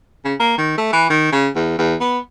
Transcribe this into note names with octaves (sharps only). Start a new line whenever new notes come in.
C#3
A#3
D#3
A3
E3
D#3
C#3
E2
E2
B3